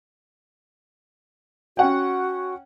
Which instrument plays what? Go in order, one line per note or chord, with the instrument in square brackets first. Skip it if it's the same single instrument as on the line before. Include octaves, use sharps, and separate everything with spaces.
[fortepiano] C#4 F#5 G5 [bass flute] F#4